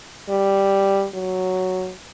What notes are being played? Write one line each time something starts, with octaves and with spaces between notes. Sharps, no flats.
G3
F#3